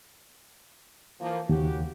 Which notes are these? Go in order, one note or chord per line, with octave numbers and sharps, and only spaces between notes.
E3 F3 A#3
D#2 C#3 F#4 G4